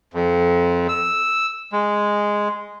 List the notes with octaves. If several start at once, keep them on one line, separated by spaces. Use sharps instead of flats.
F2
E6
G#3